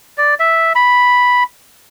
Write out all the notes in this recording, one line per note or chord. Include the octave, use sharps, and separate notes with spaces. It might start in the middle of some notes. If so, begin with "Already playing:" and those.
D5
E5
B5